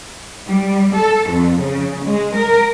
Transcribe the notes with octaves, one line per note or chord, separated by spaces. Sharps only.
G3
A4
F2
C#3
G#3
A#4